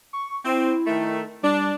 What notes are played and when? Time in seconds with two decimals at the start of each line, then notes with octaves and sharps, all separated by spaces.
0.13 C#6
0.45 C4 E4
0.87 D#3 A3
1.43 G3 D4